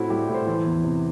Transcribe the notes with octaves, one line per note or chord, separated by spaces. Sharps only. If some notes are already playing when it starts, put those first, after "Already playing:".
Already playing: A2 C4 E4 F#4
G3 G4
A2
C5
E3
E2
C3